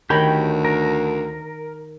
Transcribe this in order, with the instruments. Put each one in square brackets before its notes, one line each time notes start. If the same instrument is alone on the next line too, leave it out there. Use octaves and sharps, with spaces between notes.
[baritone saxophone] D2 [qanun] D#3 [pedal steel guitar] G4 A#4 G5 [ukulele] C#5 B5
[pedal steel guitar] A#4